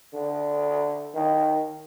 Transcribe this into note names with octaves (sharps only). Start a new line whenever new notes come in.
D3
D#3